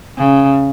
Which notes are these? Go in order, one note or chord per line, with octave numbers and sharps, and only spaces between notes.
C#3